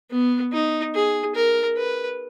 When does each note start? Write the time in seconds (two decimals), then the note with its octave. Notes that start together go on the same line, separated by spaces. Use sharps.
0.11 B3
0.53 D#4
0.95 G#4
1.36 A#4
1.77 B4